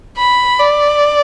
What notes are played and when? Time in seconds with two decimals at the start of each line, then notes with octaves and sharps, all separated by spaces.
0.17 B5
0.59 D5